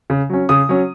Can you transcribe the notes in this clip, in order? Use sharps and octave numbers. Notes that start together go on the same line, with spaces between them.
C#3
F#3 C#4
C#3 D#6
F#3 C#4